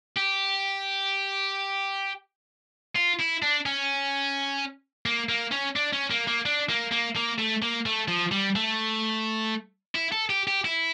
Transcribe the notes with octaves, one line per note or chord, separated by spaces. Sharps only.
G4
F4
E4
D4
C#4
A#3
A#3
C#4
D4
C#4
A#3
A#3
D4
A#3
A#3
A#3
A3
A#3
A3
F3
G3
A3
E4
A4
G4
G4
E4